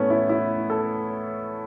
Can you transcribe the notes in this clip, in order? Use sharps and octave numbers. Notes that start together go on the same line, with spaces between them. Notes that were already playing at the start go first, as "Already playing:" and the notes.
Already playing: A2 E3 A3 B3 C#4
E4
E4
A4